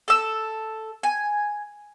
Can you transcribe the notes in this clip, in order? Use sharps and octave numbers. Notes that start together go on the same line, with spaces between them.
A4 E6
G#5